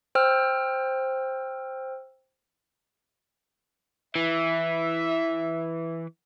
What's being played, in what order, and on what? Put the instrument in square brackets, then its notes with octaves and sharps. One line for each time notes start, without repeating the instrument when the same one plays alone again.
[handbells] C5 G5 E6 F6
[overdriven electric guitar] E3 [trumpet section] E5